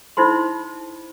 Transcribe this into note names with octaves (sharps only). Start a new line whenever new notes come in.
D#4 E4 C5 B5 C6